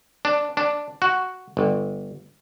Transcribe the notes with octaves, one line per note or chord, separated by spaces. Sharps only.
D4
D4
F#4
G1